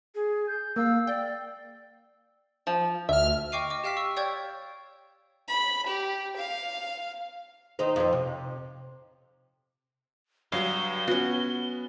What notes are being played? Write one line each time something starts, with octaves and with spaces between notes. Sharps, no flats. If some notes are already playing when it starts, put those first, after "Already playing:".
G#4
G6
A#3 F5 E6
D5 G5
F3
D2 E5 F6
D#5 G5 C#6 D6 C7 D#7
D#5 D6
G4 F5 G5 F6 B6
C#6 E6
C#5 D5 G5 C#6 G6 G#6
B5
G4
F5
D#3 D#4 C5
F2 C5
C3
G2 F#3 F5 G7
B3 C#4 F#4